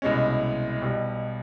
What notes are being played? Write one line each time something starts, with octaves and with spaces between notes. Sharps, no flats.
C2 B2 G#3 C#4
B1 B2 G3